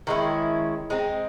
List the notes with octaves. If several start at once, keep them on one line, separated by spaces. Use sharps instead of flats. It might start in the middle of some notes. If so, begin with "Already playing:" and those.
D#3 G#3 C#4 E4
G#3 C4 D#4